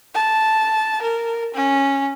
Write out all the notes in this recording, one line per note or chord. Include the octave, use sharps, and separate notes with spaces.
A5
A#4
C#4